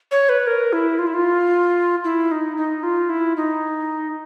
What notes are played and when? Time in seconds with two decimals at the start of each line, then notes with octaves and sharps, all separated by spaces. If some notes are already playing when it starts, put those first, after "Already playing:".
0.11 C#5
0.29 B4
0.47 A#4
0.73 E4
0.99 F4
1.07 E4
1.14 F4
2.04 E4
2.31 D#4
2.57 D#4
2.83 F4
3.09 E4
3.37 D#4